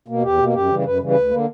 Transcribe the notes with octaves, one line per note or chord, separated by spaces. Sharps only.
B2 A#3
E2 G4
B2 A#3
F#2 G4
C#3 E3 G3
F#2 B4
C#3 E3 G3
B4
D2
D3 A#3